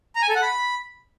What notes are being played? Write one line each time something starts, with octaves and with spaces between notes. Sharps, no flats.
A#5
G#5
A4
F#5
B5